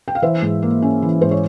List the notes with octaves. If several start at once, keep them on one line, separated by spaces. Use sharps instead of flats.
G5
F5
E3 C5 E5
G#2
A#3
C#4
E3
G#2 C5
C#5